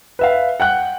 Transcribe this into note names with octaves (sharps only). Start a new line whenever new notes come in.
B4 E5 F5
F#5 G5 F#6